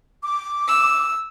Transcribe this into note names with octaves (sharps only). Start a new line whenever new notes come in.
D6
E6